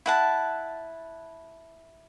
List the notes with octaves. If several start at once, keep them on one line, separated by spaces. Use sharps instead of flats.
E4 F#5 A5